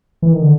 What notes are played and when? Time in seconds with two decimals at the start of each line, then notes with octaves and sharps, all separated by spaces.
0.22 E3
0.32 D#3
0.42 D3